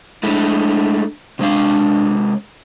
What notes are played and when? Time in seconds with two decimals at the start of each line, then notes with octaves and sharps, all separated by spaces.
0.23 G#3 A3 D4 E4
1.39 C3 G#3 D4 F5